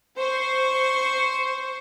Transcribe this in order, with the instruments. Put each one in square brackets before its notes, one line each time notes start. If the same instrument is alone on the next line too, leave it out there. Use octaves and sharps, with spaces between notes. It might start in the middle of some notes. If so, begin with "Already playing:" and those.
[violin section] C5 [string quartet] C#6